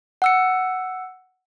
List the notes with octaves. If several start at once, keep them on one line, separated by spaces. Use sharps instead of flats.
F#5 E6 C#7